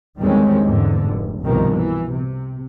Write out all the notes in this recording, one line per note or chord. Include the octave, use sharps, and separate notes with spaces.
E2 D#3 G3 G#3 C4 C#4
E2 G#2 D3
F1
C2 G2 B2 D#3 F3 A#3
E3
C3